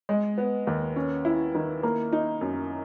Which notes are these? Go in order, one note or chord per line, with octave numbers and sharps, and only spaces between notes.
G#3
B3
D#2
C#4
E4
D#3
A#3
D#4
F#2